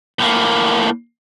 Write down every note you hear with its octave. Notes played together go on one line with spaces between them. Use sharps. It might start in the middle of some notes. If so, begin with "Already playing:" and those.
A2 A#3